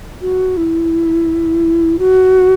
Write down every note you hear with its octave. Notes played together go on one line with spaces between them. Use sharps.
F#4
E4
F#4